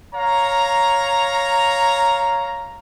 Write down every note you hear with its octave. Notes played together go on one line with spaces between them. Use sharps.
C#5 F5 A#5